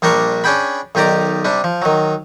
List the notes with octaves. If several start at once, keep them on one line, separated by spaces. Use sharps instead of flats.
A#1 G3 D4 A#4 C6 C#6
C#4 D4 G#4 G5 B5
B1 D#3 G4 D5 A#5 D6
C3 G3 D4
F3
D#3 F#3